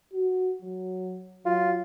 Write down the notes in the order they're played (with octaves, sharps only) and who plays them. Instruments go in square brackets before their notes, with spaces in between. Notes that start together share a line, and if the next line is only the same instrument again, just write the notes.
[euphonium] F#4
F#3
[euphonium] F#3 [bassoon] F4